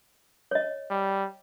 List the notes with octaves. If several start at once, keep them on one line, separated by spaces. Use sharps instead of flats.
C#5 D#5
G3